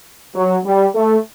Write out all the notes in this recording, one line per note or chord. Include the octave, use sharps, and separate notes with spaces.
F#3
G3
A3